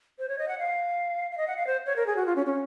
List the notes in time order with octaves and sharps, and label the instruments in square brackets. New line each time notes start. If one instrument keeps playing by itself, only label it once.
[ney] C5
C#5
D#5
F#5
F5
F5
D#5
F#5
F5
C5
C#5
A#4
G#4
F#4
F4
C#4
C#4